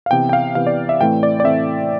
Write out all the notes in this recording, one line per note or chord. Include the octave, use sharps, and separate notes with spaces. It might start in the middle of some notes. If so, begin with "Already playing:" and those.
F5
C3 E3 B3 G5
G5
F5
C3 E3 B3 F5
D5
E5
A2 E3 A3 C4 G5
D5
D5
A2 E3 A3 C4 E5